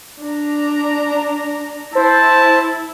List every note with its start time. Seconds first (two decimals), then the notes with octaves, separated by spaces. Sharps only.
0.21 D4 A#5
1.95 E4 C5 A5